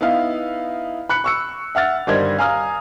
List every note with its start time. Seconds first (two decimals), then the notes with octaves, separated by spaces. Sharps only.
0.01 B3 D#4 E4 F5
1.09 B5 F#6 C#7
1.24 C#6 E6 C#7
1.75 E5 F#5 F6 A6
2.07 G1 D#3 G3 C5 D#5 G#6
2.38 F5 G#5 A#5 D#6 F6